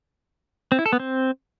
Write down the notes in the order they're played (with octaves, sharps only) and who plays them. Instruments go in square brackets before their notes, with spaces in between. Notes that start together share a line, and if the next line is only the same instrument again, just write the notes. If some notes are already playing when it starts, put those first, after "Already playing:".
[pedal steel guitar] C4
E4
A4
B3
C4